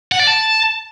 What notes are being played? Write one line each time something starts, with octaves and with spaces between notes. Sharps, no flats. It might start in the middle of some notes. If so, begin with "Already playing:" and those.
F#5
D5
A5